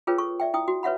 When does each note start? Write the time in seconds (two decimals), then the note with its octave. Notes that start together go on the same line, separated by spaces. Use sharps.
0.07 F4 G#4 A#4 B4 C#5 G5
0.18 A4 C#6
0.40 D5 E5 G5
0.54 E4 G5 D#6
0.68 F#4
0.83 B4 C#5 E5 F#5 B5